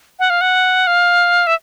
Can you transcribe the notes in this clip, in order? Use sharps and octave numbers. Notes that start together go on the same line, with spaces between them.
F#5
F5
F#5
F5
E5